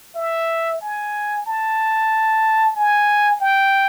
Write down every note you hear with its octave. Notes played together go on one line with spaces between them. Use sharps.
E5
G#5
A5
G#5
G5